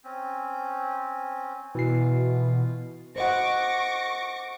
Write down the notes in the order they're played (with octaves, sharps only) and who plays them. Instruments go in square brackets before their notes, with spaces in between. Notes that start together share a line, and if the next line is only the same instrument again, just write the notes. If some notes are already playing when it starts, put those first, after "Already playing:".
[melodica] C4 C#4
[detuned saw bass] B2 [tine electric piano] E3 C7 [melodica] F4
[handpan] C5 D#5 F#5 [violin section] C#6 D6 A#6